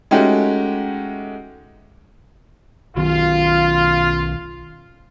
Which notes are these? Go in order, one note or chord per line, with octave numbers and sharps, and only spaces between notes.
G#3 A3 C#4 D#4 F#4 G4
B1 D#3 F4